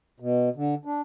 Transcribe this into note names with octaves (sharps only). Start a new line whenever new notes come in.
B2
D3
D4